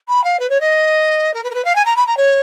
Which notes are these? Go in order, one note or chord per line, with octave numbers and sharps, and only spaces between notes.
B5
F5
B4
C#5
D#5
A#4
B4
A#4
B4
F5
G#5
A#5
B5
A#5
C#5